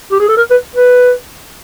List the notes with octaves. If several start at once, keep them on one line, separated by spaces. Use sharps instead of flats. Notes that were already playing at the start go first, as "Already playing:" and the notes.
G4
G#4
A4
A#4
B4
B4